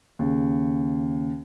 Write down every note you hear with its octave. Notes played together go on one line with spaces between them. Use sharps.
D#2 C#3